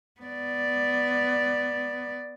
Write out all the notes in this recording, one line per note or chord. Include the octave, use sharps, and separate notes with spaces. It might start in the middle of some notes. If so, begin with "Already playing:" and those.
B3 D5